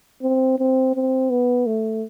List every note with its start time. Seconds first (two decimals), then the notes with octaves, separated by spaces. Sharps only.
0.22 C4
0.59 C4
0.95 C4
1.30 B3
1.66 A3